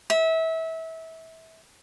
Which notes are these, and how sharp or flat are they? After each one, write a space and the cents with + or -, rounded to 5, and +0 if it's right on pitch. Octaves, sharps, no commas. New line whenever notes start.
E5 -25